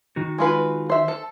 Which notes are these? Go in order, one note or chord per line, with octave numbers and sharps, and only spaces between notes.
D#3 D#4 F#4
G#3 F4 B4
C5 E5
A4